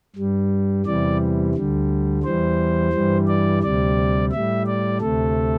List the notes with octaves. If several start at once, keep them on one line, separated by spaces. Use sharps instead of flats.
G2 G3
E2 C3 E3 G3 D5
D2 D3 G3
E2 E3 G3 C5
G2 E3 G3
D5
D2 C3 G3 D5
A2 G3 E5
D5
D2 C3 A3 A4